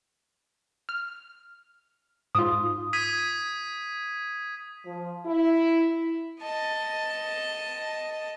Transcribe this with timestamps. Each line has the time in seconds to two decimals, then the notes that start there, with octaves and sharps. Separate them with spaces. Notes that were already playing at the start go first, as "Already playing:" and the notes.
0.89 F6
2.35 G#2 F4 D#6
2.93 D#6 G#6 B6 D#7
4.85 F3
5.26 E4
6.41 D#5 A5